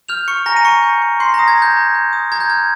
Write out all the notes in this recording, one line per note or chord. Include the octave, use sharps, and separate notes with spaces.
F6 G6 F7
C#6 C#7
G#5 A#5 A#6
D#7
G#5 C#6 C#7
G6
C#6
C6 G6 C7
A#5 A#6
D#6
G#6
A#5 G6
A#5
G6
D#6
A#5 G#6
G6
F6 G#6